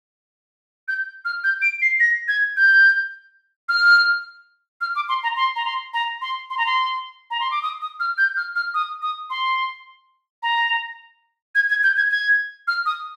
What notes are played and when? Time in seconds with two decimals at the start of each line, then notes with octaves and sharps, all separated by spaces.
0.88 G6
1.25 F6
1.44 G6
1.62 D7
1.82 C7
2.00 A#6
2.28 G#6
2.57 G6
3.69 F6
4.81 F6
4.96 D6
5.09 C6
5.23 A#5
5.37 C6
5.56 A#5
5.65 C6
5.94 A#5
6.21 C6
6.50 C6
6.58 A#5
6.66 C6
7.31 A#5
7.40 C6
7.51 D6
7.62 D#6
7.81 D#6
8.00 F6
8.18 G6
8.37 F6
8.56 F6
8.74 D#6
9.02 D#6
9.30 C6
10.43 A#5
11.55 G#6
11.70 G#6
11.83 G6
11.97 G#6
12.11 G#6
12.68 F6
12.86 D#6